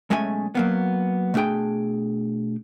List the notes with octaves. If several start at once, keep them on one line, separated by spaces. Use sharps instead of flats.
B1 G#3 A3 C#4 G#5
F#3 A#3 B3
B2 A3 D4 G#4 G5